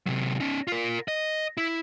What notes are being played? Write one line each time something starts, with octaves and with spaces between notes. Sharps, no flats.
C3 F#3
C#4 D#4
F4 A#4
D#5
E4